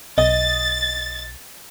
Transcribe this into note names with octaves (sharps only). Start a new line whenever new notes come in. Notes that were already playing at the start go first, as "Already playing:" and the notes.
B1 D#5 A6